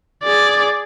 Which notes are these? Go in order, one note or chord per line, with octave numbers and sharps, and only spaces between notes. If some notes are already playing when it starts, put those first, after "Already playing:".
G#4 D5